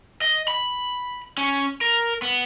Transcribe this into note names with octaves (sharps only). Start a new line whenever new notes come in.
D#5
B5
C#4
A#4
B3